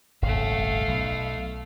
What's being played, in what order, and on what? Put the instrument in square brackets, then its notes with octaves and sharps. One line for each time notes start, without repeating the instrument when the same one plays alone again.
[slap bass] D#1 G#1 C#3 [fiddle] A3 F5
[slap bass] B1